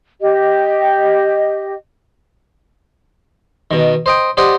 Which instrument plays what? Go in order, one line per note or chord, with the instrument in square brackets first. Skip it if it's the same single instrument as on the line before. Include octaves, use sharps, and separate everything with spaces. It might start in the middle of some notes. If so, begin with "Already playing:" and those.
[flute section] G4 D#5
[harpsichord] B2 D#3
C5 D#5 G5
G4 C5 D5 D#5 F#5